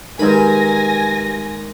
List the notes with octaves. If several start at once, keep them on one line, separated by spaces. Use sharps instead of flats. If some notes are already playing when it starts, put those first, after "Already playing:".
G2 D#3 G#3 A#4 G#5 B5 A#6